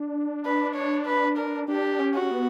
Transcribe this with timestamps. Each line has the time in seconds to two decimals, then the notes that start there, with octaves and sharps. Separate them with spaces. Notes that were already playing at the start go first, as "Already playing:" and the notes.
Already playing: D4
0.45 B4
0.75 C#5
1.06 B4
1.38 A#4
1.68 D4 G4
2.00 C#4
2.15 F#4
2.22 C#4
2.31 B3